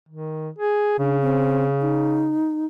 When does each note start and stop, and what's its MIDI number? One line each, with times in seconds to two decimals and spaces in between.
0.09 0.49 51
0.58 0.95 68
0.99 2.40 49
0.99 1.18 62
1.22 1.66 60
1.81 2.66 63